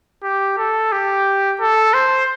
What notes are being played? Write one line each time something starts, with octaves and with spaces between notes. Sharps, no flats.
G4
A4
G4
A4
C5